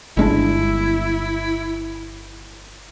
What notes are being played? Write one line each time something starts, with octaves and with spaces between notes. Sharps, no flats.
G1 G#3 D4 E4